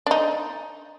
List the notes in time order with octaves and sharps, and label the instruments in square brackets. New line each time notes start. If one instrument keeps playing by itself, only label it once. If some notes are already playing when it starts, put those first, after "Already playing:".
[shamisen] D4 D#4